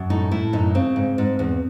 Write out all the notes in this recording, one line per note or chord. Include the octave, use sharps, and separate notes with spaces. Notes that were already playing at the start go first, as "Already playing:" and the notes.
Already playing: F#2
A2 D#4
A2 E4
F#2 D#4
C#3 C4
G#2
G#2
E2